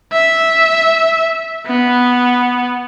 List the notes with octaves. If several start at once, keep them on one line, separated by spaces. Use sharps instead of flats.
E5
B3